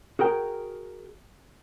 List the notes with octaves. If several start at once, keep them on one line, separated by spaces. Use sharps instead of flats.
F#4 G#4 A#4 G5